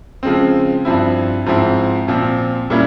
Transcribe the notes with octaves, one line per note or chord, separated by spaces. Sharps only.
C#3 F3 G#3 C4
G2 F3 C4 E4
G#2 F3 C4 E4
A#2 F3 C4
A#2 G3 A#3 C#4 E4